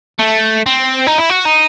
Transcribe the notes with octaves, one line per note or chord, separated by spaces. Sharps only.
A3
C4
D#4
E4
F#4
D#4